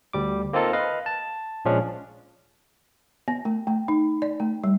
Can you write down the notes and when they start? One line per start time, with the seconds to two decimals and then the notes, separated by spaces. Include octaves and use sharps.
0.13 D2 G3 D6
0.53 A#3 C4 D#4 F4 A4 A#4
0.73 B4 D#5 F5
1.06 A5
1.65 A#1 F3 G#3 C#4 D4
3.28 B3
3.45 A3
3.67 A3
3.88 D#4
4.22 D5
4.40 A3
4.64 G3